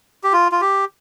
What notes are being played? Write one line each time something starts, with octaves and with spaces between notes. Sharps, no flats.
G4
F4
F4
G4